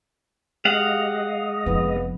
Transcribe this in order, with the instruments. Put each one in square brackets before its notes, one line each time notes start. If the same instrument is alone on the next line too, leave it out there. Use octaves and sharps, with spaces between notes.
[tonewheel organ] G#3 D#5 [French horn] G4 [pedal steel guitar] F5 F#5
[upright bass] F1 F3 [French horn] B3